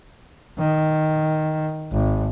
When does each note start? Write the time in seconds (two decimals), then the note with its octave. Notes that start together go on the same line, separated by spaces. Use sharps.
0.59 D#3
1.92 G#1